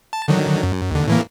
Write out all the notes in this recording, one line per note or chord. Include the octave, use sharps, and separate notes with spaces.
A5
D3 D#3 F#3
F#2
D#2 D3
A2 E3 A#3